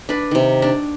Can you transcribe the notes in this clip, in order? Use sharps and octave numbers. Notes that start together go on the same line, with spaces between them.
D4 B4
C3 D#3
D4